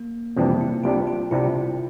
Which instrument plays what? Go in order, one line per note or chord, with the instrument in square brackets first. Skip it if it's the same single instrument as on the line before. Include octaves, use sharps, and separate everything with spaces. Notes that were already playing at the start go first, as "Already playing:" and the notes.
Already playing: [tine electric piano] A#3
[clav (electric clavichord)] F2 C3 E3 G3 D4 [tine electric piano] A#3
[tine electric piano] E4
[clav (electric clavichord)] C2 C3 G3 D4 [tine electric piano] F4
[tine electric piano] F4
[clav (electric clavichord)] C2 C3 G3 D4 [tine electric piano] E4